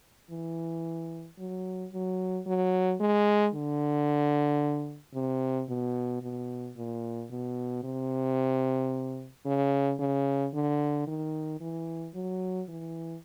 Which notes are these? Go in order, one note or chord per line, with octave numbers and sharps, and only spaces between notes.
E3
F#3
F#3
F#3
G#3
D3
C3
B2
B2
A#2
B2
C3
C#3
C#3
D3
D#3
E3
F#3
E3